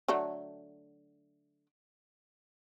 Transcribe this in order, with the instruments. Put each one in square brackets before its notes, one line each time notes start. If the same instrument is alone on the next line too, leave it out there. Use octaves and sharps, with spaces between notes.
[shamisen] D3 F#3 A3